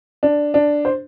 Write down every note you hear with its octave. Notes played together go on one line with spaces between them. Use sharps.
D4
D4
C5